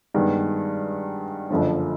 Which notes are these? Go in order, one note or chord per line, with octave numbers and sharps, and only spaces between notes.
G2 D#3 G#3 B3
F#1 F#2 D3 F3